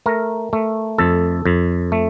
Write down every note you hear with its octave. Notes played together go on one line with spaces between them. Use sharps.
A3 A#4
A3
F2 A4
F2
A3